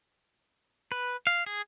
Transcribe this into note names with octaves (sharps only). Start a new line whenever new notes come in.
B4
F5
G#4